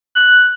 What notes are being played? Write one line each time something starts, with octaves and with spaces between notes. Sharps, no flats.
F#6